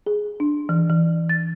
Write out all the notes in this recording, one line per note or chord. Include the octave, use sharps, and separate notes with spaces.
G#4
D4
E3
E3
A6